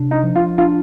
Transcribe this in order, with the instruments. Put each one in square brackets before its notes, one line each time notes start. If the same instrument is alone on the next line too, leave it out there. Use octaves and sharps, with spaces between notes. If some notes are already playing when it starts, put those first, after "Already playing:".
Already playing: [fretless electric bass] C3 D4
[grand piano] D#4
[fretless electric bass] F3
[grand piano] F4
[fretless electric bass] D4 [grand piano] F4